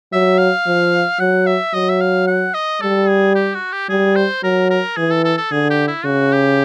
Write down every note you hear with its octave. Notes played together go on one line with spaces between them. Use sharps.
F#3 E5
F5
F3
F#3 F#5
E5
F#3 D#5
E5
F5
F#5
D#5
G3 A4
G#4
G4
F#4
G4
G3 G#4
C5
F#3 A#4
A#4
E3 G#4
A4
A4
A4
D3 G#4
G4
E4
C#3 F#4
G4